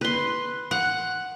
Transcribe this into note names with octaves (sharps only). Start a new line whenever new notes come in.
B4 C6
F#5